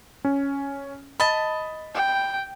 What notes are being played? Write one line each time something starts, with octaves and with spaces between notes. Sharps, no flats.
C#4
D#5 A5 B5
G5